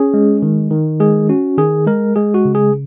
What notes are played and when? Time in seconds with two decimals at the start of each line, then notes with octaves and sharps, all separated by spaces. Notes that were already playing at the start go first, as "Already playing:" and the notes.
Already playing: C#4 G#4
0.14 G#3
0.42 D#3
0.71 D#3
1.00 G#3 G#4
1.29 C#4 F#4
1.57 D#3 G#4
1.87 G#3 A#4
2.16 G#3 G#4
2.34 F#4
2.45 C#3
2.55 G#4